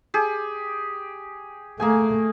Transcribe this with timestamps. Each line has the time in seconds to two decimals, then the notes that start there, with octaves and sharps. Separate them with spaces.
0.14 G4 G#4
1.80 A3 A#3 G#4 G#5